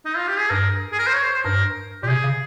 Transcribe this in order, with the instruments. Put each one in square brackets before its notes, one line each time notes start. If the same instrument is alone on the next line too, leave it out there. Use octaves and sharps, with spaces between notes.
[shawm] D#4
F4
G4
G#4
[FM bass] G2 [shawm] A#4
[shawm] G#4
A#4
C5
C#5
C5
C5
[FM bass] G2 [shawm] A#4
[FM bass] A#2 [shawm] G4
[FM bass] C3 [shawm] G#4
[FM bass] C#3